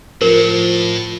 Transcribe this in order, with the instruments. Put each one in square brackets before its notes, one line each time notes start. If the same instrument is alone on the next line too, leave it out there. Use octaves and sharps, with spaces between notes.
[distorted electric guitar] A2 [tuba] F3 [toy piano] A#4